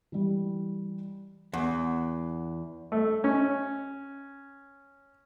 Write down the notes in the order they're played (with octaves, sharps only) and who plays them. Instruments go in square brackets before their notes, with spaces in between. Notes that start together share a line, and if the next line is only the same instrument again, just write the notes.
[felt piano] E3 G3
[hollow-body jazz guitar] E2 [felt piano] F#5
[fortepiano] A3
C#4